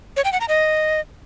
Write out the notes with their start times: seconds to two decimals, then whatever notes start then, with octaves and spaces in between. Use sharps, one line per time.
0.17 C#5
0.25 G5
0.33 F#5
0.40 A#5
0.48 D#5